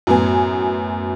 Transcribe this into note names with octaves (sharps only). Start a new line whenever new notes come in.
F#2 A2 F#3 B3 G#5